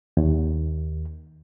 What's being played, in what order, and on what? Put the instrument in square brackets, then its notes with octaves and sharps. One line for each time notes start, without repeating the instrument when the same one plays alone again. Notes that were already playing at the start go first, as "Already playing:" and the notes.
[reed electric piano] D#2